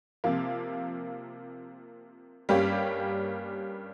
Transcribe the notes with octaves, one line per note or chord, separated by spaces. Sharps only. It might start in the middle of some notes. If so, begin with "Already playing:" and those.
C3 F3 A#3
G2 G3 A#3 C#4 G4